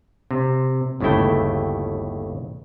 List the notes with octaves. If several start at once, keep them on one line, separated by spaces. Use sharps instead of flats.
C3
G1 D#2 C#3 A3 E4 G5